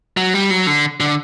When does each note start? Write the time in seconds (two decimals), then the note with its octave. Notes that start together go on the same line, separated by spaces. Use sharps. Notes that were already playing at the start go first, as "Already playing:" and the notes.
0.17 F#3
0.34 G3
0.50 F#3
0.67 D3
1.00 D3